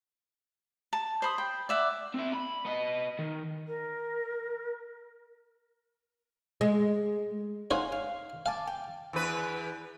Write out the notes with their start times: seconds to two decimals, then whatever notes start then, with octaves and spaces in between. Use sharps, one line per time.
0.93 A5
1.22 C5 B5 D#6
1.38 G5
1.69 D5 E5 F#5
2.14 C4 E4
2.34 B5
2.65 B3 D#5
3.19 D#3
3.67 A#4
6.61 G#3
7.71 D#4 C5 C#5 F5 F#5 G#5
7.92 F5
8.46 F5 G#5 A5 D6
8.67 G5
9.13 E2 B4